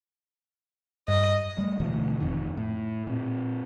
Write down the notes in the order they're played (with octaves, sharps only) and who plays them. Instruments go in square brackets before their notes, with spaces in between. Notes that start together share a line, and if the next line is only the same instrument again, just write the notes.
[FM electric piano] G2 [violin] D#5
[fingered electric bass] G3 A3
D1 B2 E3 A3
F1 F2 D#3
A2
A#2 C4